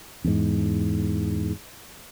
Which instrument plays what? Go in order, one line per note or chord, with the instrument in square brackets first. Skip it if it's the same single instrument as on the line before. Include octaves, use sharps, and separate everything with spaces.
[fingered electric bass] E2 G#2